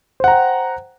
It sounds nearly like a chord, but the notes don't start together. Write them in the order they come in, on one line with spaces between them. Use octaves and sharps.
C5 F#5 A#5 G5